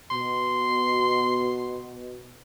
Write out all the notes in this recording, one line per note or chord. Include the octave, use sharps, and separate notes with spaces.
B2 C6